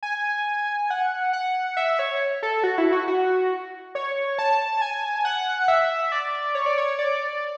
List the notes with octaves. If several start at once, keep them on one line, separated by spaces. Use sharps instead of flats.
G#5
F#5
F#5
E5
C#5
A4
F#4
E4
F#4
F#4
C#5
A5
G#5
F#5
E5
D5
C#5
D5
C#5
D5